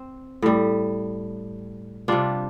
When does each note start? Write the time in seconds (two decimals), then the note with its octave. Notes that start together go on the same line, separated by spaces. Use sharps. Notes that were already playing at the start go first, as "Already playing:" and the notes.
Already playing: C4
0.42 A2 G3
2.08 C3 G3 D4 F4